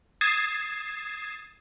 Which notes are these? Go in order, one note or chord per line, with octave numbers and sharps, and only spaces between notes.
D#6 G#6 A6 C7 E7